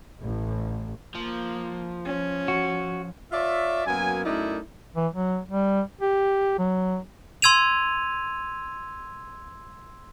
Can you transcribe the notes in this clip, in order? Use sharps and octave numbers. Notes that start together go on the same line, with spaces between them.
A1
F3 A#3
C#4
F#4
F4 C#5 D5 E5
F#2 F#3 A#3 B3 G#5
F#2 A3 D#4 E4 A#4 D5
E3
F#3
G3
G4
F#3
C6 E6 G#6 D#7 F7